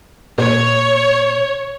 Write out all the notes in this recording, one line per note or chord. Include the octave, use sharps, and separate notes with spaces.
A#2 C#5